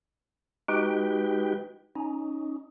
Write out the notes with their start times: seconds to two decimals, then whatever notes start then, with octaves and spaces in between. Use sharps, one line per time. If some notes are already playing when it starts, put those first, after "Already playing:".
0.68 G#3 D#4 F#4 G4 B4 G5
1.96 C#4 D#4